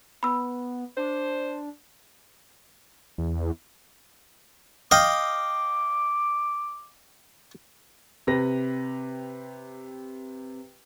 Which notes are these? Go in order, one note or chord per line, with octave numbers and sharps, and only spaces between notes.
B3 B5 E6
D4 C5
E2
D#5 F5 G5 D6
C3 G4 B4 A#6